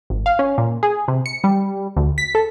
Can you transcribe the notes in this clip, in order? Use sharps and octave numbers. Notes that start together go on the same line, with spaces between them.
G#1
F5
C#4
A#2
G#4
C3
C#7
G3
D2
B6
A4